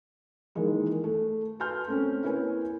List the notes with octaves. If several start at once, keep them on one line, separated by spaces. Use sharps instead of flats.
D#3 E3 G#3 A#3
A3
B4 G#5 A5 C6 F6 G6
A3 C4 C#4
A#3 E4 B4 C#5 G#5